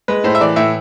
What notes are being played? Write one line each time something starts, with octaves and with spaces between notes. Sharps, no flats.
G#3 B4
A2 C5
E5
E3 D5
A2 E5